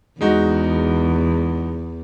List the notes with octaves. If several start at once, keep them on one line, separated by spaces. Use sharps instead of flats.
E2 G#3 D#4 F#4